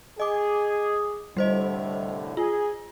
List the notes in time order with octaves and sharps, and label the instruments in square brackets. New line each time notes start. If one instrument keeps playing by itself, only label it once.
[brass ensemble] G#4 [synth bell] D#5 D6
[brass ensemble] C2 A2 D3 [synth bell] G3 C5 D#5
[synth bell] F4 [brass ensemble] G#4